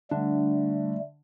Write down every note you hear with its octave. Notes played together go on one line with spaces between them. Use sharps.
D3 G3 A3 D4